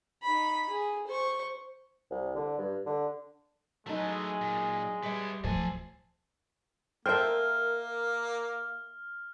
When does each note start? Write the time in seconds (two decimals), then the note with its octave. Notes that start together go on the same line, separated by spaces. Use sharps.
0.23 D#4 B5
0.70 G#4
1.07 C5 C#6
2.10 C2
2.36 D3
2.58 G2
2.86 D3
3.86 F#3 G#3 A3 D#4 B4
4.41 A#2
5.03 G3 B4 C#5 E5
5.44 D1 F3 A4 C5 G#5
7.06 A#3 A4 A#4 C5 E5 G5 F6